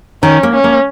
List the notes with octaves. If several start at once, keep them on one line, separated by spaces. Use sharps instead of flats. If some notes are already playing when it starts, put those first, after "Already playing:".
D#3 C#4
A#3
C#4
A#3